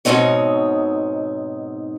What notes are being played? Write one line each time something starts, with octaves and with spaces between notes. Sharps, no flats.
G#2 B2 F#3 C4 D#4 C#5